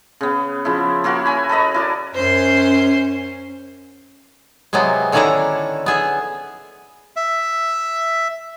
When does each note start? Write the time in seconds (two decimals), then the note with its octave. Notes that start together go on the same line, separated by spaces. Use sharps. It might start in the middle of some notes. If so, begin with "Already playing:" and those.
0.21 C#3 B3
0.65 C#3 F3 E4
1.04 A#3 E4 F#4 A#4
1.26 C#5 G#5 B5
1.49 A4 B4 D#5 A#5
1.74 E4 A#4 D5
2.15 F#2 C#4 C5 C6
4.73 C3 F#3 G#3 A#3 B3
5.12 D3 D#3 C#4 D4 E4 A#5
5.86 B3 G#4 E5
7.16 E5